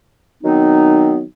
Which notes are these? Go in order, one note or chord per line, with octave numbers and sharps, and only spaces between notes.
D#3 F#3 B3 C4 D#4